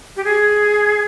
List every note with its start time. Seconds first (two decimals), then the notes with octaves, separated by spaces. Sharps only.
0.16 G4
0.24 G#4